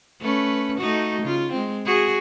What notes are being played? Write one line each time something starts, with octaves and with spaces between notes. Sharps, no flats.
A3 C#4 B4
A3 D#4 F#4
C#3 F4
G#3 C4
F#4 G#4